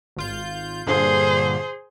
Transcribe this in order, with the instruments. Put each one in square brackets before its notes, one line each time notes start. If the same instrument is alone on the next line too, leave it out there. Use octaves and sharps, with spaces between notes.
[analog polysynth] G#1 F4 G6
[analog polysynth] G2 A#2 D3 [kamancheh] G#4 C5